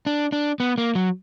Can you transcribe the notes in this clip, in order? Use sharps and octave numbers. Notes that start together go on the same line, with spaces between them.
D4
D4
B3
A#3
F#3